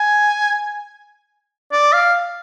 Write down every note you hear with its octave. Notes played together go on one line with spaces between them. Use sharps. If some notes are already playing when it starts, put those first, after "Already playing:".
Already playing: G#5
D5
F5